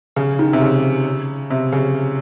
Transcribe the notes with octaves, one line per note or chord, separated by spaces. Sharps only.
C#3
D#3
C3
C#3
C3
C#3